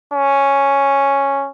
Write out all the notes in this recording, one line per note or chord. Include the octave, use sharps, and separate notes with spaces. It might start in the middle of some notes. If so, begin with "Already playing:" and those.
C#4